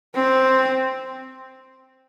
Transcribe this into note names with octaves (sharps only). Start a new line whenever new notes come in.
C4